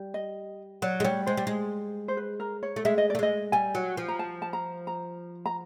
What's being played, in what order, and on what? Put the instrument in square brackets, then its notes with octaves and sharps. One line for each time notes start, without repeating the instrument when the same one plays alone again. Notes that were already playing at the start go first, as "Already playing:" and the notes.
Already playing: [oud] G3
[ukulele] D#5
[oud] F#3 [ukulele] D5
[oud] G#3
[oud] G3 [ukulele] C#5
[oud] G#3 [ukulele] C5
[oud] G3
G#3
[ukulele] C5
B4
A#4
C#5
[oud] A3
[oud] G#3 [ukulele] E5
[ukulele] D#5
[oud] A3 [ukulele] D5
[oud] G#3 [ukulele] D#5
[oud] G3 [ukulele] G#5
[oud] F#3
F3
[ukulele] A#5
A5
A5
A#5
A#5
A#5